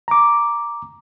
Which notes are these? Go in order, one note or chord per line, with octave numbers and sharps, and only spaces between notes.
A#5 D6